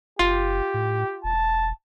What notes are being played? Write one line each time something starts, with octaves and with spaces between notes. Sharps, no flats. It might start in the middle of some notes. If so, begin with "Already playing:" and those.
F#1 F4 G4
A2
E1 A5